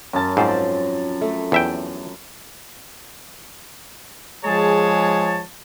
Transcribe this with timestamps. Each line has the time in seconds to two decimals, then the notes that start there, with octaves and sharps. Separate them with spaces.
0.13 F#2 A5
0.37 G#2 F3 C4 C5
1.21 A3
1.52 E2 E5 G5
4.45 F3 G#3 G#4 C#5 A5